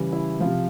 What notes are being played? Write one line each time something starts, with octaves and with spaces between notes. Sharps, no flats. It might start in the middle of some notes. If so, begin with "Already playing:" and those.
Already playing: C#3 E3 G3
E4
F3 F4
C3